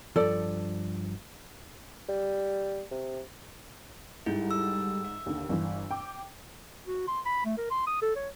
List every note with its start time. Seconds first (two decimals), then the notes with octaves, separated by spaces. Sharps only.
0.16 G2 F3 A4 D5
2.09 G3
2.91 C3
4.26 G#2 G3 E4 A4 G5
4.51 E6
5.05 E5
5.26 D#2 D3
5.49 G1 E3
5.91 G5 D6
6.87 F#4
7.08 C6
7.26 B5
7.45 A3
7.58 A#4
7.71 C6
7.87 D#6
8.02 A4
8.16 C#5